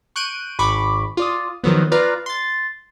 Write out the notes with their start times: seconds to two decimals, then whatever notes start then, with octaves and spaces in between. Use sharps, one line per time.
0.16 C#6 F#6 G6 D7 D#7
0.59 G#1 B5 C#6 D6
1.17 F4 D5 D#6
1.64 D#3 F3 F#3 B3
1.92 F4 B4 D5 F5 A#5
2.26 C6 A6